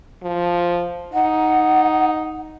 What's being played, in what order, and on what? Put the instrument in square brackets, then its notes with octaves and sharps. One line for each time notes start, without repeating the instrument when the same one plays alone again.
[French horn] F3
[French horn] D#4 [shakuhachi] F#5